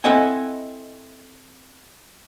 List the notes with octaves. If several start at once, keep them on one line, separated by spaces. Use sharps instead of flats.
C4 E4 A4 D#5 F#5 G#5